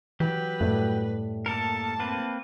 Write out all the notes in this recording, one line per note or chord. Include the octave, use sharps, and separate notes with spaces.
E3 F#3 G4 B4
F#2 A2 G3 A3
A#3 A4 A#4 A5
A#3 C4 B4